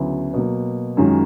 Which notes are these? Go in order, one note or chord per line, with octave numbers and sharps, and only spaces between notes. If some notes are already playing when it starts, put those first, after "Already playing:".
Already playing: D2 C#3 F#3 B3 E4
B2 F#3 A#3
F#2 D#3 G#3 C#4 F4